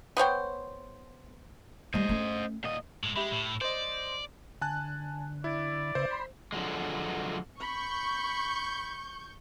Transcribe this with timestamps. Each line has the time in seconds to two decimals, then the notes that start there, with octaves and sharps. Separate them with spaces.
0.17 B3 C5 C#5 G5
1.94 G3 A3 C5 D#5
2.09 A3 C#4
2.64 A#2 D#5
3.03 A2 G#3
3.16 G#3 G4 E5 B5
3.32 A2
3.61 C5 D5 D#5
4.61 D3 G#5 A5 F#6
5.44 E4 D5
5.95 C#3 B4 C5 E5
6.10 B5 C6
6.53 D3 F3 F#3 G#3
7.60 B5 C#6 G6